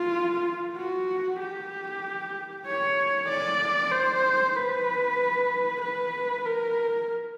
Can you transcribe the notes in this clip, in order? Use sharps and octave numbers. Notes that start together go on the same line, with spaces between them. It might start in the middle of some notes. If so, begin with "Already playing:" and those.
Already playing: F4
F#4
G4
C#5
D5
C5
B4
B4
A#4